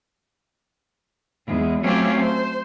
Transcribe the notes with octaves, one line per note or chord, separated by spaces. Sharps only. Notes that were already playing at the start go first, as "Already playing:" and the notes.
E2 G#3
F#3 A3 C4 C#4 F4 G4
C5